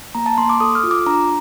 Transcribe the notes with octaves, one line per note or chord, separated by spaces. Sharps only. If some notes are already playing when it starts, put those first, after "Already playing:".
A#3 A#5
A5
A#3 C6
D6
A4 D#6
F6
F4
D6
D4 A#5